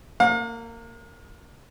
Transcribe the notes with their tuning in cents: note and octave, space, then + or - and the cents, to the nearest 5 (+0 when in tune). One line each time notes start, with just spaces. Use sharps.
A#3 -20 F5 +40